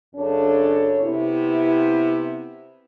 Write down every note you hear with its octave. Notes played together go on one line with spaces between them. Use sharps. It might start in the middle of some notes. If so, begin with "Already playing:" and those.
F#2 C#3 D4 A4 C#5
C3 B3 E4